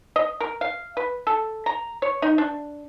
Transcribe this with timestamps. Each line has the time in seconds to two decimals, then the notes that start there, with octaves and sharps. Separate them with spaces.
0.16 D#5
0.40 A#4
0.61 F5
0.97 B4
1.27 A4
1.66 A#5
2.02 C#5
2.22 D#4
2.38 D4